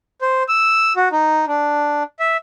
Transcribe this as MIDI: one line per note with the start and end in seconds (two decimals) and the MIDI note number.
0.22 0.43 72
0.48 0.93 88
0.96 1.08 66
1.12 1.45 63
1.47 2.03 62
2.20 2.37 76